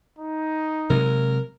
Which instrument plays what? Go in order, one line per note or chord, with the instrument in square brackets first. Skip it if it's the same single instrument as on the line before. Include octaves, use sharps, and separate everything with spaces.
[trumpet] D#4
[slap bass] C3 F#3 G#3 [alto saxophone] A#4